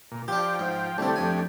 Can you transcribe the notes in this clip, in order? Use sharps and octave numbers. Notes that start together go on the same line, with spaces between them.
A#2
F3 D4 G4 G5
G#2
C2 D3 A3 C4 D4 G4
F2 G#5